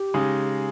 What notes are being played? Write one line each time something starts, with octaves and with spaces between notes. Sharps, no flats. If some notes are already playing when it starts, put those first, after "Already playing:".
Already playing: G4
C#3 G#3 D#4